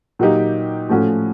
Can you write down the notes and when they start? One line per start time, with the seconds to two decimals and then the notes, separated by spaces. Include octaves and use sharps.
0.19 A#2 F#3 A#3 D#4 G4
0.89 A2 F3 A3 C#4 F#4